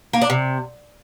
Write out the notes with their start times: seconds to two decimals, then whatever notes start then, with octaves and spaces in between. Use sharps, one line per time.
0.13 A#3
0.22 D4
0.30 C3